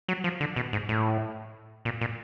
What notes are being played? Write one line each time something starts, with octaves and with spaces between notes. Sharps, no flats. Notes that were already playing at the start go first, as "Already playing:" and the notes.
F#3
F3
D3
B2
G#2
A2
A#2
A#2